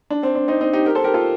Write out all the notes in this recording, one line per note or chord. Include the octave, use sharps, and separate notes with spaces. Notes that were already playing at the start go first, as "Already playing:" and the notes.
D4
C4
D4
C4 D#4
C4 D#4
D#4 G4
G4 A#4
A4 C5
G4 A#4
F4 A4